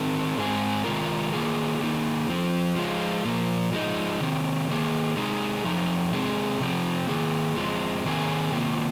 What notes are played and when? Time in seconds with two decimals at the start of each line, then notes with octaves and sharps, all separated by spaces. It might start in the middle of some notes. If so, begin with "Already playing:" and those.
Already playing: D#3 C4 D#4 A#4
0.37 G#2 G#3 C4 G#4
0.84 C3 D#3 G#3 F4 A#4
1.33 D#3 A#3 F4 G#4
1.80 D#3 A#3 D#4 G#4
2.28 F2 F3 C4
2.76 F3 G#3 F4
3.25 A#2 F3 A#3
3.72 F3 G#3 D#4
4.20 C3 D#3 C4
4.68 D#3 A#3 G#4
5.17 C3 G#3 D#4 G#4
5.64 F2 F3 D#4
6.13 C3 G#3 C4 G#4
6.60 C3 F3 C4
7.07 D#3 A#3 G#4
7.56 F2 F3 G#3
8.04 C3 D#3 A#3 G#4
8.52 C3 D#3 A#3 F4